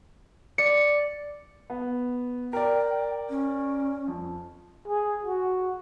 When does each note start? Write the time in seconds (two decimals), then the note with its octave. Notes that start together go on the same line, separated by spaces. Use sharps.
0.58 D5 C#7
1.70 B3
2.53 A#4 D5 G5
3.30 C#4
4.08 F2
4.88 G#4
5.26 F#4